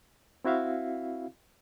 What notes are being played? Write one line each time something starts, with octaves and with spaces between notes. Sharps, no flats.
C4 E4 F#4 E5 F5